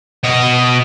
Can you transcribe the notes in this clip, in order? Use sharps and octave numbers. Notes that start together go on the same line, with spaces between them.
B2 D#5